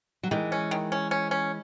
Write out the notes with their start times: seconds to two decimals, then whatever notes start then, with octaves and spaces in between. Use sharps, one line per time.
0.23 F#3
0.31 D#3 E3 G#3
0.52 C#4
0.71 D#3
0.92 C#4
1.11 C#4
1.31 C#4